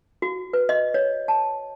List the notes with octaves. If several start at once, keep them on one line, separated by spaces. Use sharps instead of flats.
F#4
B4
D#5
C#5
A5